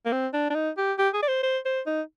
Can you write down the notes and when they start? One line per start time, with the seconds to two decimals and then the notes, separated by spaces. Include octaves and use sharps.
0.06 A#3
0.12 C4
0.33 D4
0.50 D4
0.54 D#4
0.77 G4
0.98 G4
1.14 G#4
1.22 D5
1.28 C5
1.43 C5
1.65 C5
1.86 D#4